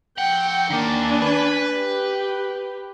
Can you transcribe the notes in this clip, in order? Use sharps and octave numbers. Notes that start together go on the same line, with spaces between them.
F3 F#5 G5
D#3 A#3 D4 G#5
B4
G4